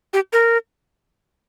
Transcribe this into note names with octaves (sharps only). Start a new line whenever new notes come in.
G4
A#4